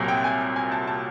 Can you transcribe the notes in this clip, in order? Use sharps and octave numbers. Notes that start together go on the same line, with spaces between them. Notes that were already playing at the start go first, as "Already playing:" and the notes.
Already playing: C2 A#2 F#3
G5
G#5
G#5
A5
A5